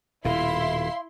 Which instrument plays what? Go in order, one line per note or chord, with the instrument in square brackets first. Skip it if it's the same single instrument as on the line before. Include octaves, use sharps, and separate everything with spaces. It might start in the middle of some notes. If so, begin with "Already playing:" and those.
[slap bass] D#1 B2 [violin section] E4 C6 [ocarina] F5